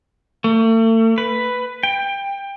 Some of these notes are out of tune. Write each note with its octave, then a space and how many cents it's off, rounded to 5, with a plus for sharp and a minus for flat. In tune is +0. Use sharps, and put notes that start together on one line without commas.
A3 +40
B4 +5
G5 +20